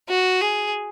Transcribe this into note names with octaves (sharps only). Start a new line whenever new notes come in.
F#4
G#4